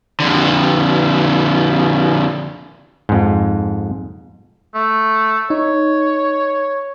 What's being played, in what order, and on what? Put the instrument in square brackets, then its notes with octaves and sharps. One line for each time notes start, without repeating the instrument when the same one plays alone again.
[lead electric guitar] F2 D3
[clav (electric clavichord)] F2 G#2
[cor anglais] A3
[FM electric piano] D#4 [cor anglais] C#5